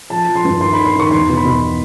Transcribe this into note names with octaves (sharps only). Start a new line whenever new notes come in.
F3 A5
F3
C6
G2
D#3 C6
D#3 B5
C6
D#3 C#6
E2 C6
B2
B5
B2